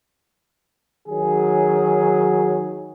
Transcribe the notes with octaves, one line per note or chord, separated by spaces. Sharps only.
D#3 F#3 G#4